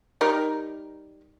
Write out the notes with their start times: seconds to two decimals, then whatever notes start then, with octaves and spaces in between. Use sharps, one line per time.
0.21 G3 D#4 A#4